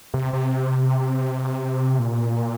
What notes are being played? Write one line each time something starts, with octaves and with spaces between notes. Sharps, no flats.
C3
C3
A#2